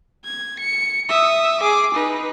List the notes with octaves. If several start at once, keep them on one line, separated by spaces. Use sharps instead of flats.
G#6
C#7
E5 D#6
G#4 D6
D#4 B4